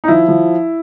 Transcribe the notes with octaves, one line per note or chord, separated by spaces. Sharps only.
D#4
F3 E4
F3